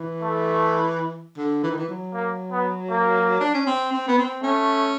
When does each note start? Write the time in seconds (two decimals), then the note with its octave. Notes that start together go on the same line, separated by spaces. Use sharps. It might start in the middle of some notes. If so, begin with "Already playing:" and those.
Already playing: E3
0.22 A3
1.38 D3
1.63 E3
1.71 D#3
1.78 E3
1.89 F#3
2.14 A#3
2.52 B3
2.90 A#3
3.40 D4
3.54 C#4
3.66 C4
3.93 C4
4.08 B3
4.18 C4
4.43 A3 C#4